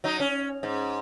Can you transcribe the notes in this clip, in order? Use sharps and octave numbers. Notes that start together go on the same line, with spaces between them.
F#3 D#4
C#4
G#2